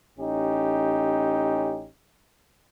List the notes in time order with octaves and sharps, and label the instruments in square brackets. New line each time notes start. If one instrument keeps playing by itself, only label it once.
[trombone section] A1 C#4 D#4 G4